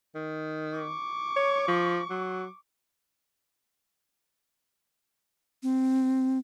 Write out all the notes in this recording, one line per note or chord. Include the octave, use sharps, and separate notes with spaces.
D#3
C#6 D6
C#5
F3
F#3
C4